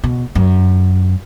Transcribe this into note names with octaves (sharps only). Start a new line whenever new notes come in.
B2
F#2